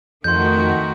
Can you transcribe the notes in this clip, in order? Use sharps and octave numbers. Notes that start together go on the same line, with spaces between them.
F2 D#3 A3 F#4 C6 G6